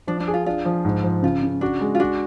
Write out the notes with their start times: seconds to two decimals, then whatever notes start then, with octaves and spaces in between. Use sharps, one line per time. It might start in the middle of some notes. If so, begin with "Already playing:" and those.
0.07 F3 D4
0.20 D4
0.28 G#4
0.34 F4
0.46 D4 F4
0.65 F3
0.85 G#2
1.04 F3
1.23 C#3 F4
1.43 C#3
1.61 D4 F#4
1.81 G#3
1.95 F4
2.00 D4 F#4